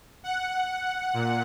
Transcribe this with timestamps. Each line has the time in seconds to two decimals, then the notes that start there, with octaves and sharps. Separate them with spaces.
0.24 F#5
1.14 A#2